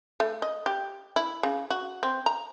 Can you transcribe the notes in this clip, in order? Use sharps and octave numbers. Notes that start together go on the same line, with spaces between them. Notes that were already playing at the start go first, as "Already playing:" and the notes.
A3
D#5
G4
E4
C#3
F#4
C4
A#5